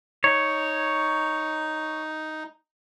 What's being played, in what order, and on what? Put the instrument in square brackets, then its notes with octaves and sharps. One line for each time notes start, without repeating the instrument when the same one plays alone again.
[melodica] D#4 [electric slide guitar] C#5